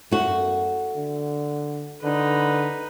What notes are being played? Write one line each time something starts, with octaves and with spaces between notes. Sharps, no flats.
F#2 A3 F#4
D3
D3 D#4 B4